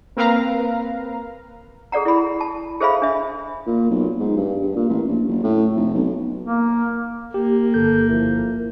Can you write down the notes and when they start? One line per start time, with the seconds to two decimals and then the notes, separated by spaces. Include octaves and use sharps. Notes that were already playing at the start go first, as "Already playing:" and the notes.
0.16 A#3 C4 A#4 B4 F5 A#5
1.92 G#4 A4 D5 F#5 A#5
2.05 E4 B5
2.41 A5
2.80 G#4 A4 C5 E5 F5 B5
3.02 D4 E5
3.67 A#2
3.90 B1
4.19 G#2
4.37 G2
4.62 G2
4.76 A#2
4.90 A1
5.07 A#1
5.28 F#1
5.43 A2
5.76 F1
5.94 B1
6.45 A#3
7.34 A#3 G4
7.74 G1 A4 G6
8.09 F3 E4 A#4